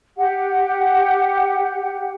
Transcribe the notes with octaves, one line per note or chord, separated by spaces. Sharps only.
G4 F#5